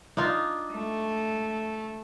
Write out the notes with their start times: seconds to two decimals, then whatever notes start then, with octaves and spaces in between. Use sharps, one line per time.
0.17 D4 D#4 F4
0.73 A3